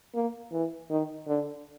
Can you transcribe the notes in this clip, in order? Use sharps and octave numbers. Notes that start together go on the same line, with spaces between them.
A#3
E3
D#3
D3